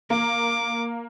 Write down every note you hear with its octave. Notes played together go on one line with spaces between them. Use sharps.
A#3 D6